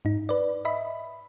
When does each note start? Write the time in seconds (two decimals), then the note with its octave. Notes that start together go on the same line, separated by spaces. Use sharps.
0.05 G#2 D#4
0.29 B4 D5
0.65 D#5 E5 B5